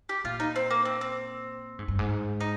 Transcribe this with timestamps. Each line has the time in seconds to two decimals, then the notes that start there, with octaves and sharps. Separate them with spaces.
0.09 G4
0.24 A#2 F4
0.40 D#4
0.56 C4
0.71 A#3
0.85 C4
1.01 C4
1.79 G#2
1.88 G2
1.99 G#2
2.40 D#4